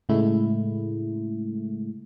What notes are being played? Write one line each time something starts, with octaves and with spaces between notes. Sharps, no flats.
A2 C#3 G#3 A3 E4